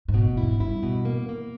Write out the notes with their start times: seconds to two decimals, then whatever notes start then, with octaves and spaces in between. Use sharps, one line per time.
0.08 G#2
0.14 B2
0.26 A#2
0.37 E4
0.43 G#2
0.60 G2 E4
0.83 B2
1.05 A#3
1.29 A#3